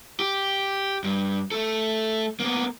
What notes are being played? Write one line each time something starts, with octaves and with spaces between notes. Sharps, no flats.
G4
G2
A3 A4
A#3 B3